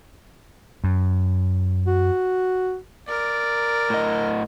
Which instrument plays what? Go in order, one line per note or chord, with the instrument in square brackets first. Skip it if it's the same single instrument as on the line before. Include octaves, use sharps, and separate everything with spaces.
[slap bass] F#2
[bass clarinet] F#4
[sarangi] A#4 [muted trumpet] D5
[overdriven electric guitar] A2 D#5